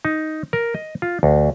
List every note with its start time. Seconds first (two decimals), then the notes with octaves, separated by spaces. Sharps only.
0.05 D#4
0.53 A#4
0.75 D#5
1.02 F4
1.23 D2